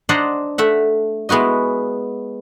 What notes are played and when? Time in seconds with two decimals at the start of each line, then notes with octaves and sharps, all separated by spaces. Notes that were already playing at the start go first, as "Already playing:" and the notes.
0.09 D4 C5 D5 D#5 F#5 A#5
0.58 A3 E5 F#5
1.29 G#3 B3 E4 F#4 D#5